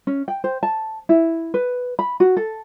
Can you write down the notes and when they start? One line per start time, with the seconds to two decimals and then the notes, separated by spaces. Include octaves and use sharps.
0.07 C#4
0.28 G5
0.44 C5
0.63 A5
1.09 E4
1.54 B4
1.99 B5
2.20 F#4
2.37 A4